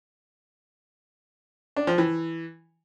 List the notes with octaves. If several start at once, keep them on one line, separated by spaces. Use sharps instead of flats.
D4
F3
E3